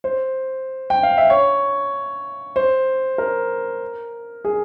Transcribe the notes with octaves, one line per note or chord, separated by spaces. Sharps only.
C5
G5
F5
E5
C#5
C5
A#4
G#4